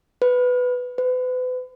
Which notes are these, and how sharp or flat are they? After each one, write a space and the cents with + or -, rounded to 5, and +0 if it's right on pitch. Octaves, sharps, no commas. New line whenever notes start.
B4 +10
B4 +40